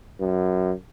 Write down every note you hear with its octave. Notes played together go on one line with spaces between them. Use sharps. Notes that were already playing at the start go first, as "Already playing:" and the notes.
F#2